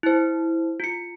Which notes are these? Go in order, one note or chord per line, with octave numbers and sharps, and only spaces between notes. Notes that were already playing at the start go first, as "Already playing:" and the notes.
E4 C5
F4 C#7